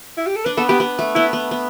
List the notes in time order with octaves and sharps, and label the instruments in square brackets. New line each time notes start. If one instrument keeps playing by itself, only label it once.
[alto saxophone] E4
G4
A4
[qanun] D4 [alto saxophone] B4
[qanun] B3 [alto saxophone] A4
[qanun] B3 [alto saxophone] G4
[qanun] B3
A3
[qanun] B3 [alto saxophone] E4
[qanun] B3
B3